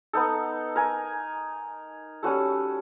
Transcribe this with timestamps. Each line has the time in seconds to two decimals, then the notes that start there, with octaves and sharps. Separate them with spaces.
0.13 B3 D#4 A4
0.76 A#4 G#5
2.23 G3 C#4 F#4 A4